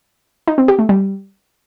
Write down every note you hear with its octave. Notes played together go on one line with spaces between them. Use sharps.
D#4
C4
G4
A3
G3